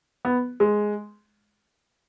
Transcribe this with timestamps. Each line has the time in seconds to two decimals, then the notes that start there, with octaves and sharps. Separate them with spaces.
0.25 B3
0.60 G#3